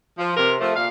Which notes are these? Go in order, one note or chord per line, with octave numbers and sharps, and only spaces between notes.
F3
C3 A#4
F3 A3
A#2 F5